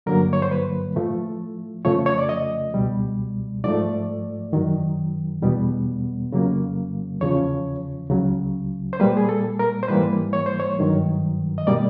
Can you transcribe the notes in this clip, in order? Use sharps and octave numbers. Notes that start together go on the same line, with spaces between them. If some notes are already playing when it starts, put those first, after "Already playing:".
G2 D3 F#3 A#3 A#4
C#5
C5
B4
A2 F3 A3
F2 C#3 F3 A3 C#5
C#5
D5
D#5
C#2 B2 G3
G#2 F3 A3 D5
F#2 D#3 F#3
E2 B2 G3 B3
F2 C#3 F#3 A#3
E2 C#3 F3 C#5
C#2 C#3 F#3
C5
A#2 G3 A#3 B4
G#4
A4
A#4
C5
G#2 E3 G3 A#3 B4
C#5
C5
C#5
G2 D#3 F#3
D#5
B2 G3 A#3 D5